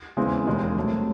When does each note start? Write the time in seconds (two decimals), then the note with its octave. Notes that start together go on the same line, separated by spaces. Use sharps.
0.17 E2 C#3 E3 G#3 C4
0.46 E1 D#2 D#3 G#3 C4
0.76 C2 C3 F#3 A3 C#4